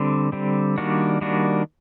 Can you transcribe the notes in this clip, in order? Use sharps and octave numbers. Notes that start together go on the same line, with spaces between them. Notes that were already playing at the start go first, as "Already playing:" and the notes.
Already playing: D3 G3 C4
D3 G3 C4
D#3 G3 A#3 D4 F#4
D#3 G3 A#3 D4 F#4